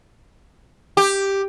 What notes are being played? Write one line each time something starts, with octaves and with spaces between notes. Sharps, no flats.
G4